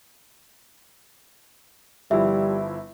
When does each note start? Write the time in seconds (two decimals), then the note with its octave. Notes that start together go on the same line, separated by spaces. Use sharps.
2.11 G1 F3 G3 E4 E5